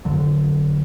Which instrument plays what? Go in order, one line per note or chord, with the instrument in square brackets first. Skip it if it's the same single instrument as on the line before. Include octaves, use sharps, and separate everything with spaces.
[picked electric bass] G1 F2 D3 F#3